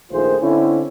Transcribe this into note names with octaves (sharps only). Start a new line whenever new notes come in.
A#1 D#3 A3 F4 G#4 C5
D3 C4 C#4 E4